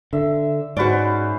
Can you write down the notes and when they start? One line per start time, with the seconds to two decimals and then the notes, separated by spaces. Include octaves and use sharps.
0.13 D3 E5
0.77 G#2 C#4 F#4 B4 C5 D5